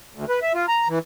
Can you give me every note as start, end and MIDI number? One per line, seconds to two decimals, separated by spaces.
0.15 0.25 38
0.29 0.40 71
0.42 0.53 76
0.55 0.66 65
0.68 0.88 82
0.88 0.99 52